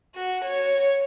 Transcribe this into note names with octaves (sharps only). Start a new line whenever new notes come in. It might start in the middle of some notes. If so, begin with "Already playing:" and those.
F#4
C#5